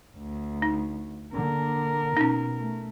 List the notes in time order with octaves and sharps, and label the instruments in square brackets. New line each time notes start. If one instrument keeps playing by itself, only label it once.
[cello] D2
[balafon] D#4
[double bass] D3 A#3 [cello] A#4
[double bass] B2 [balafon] C#4 D#4
[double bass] A3